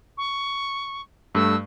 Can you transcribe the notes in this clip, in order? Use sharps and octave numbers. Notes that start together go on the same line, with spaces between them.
C#6
G2 A3 E6